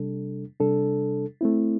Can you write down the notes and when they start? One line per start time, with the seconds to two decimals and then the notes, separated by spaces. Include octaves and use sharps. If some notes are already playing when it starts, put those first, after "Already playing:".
Already playing: C3 G3 D4 A4
0.60 C3 G3 D4 A4
1.41 A3 C4 E4